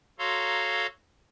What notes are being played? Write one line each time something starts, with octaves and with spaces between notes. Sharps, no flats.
F#4 A4 C#5 F5 A#5 C6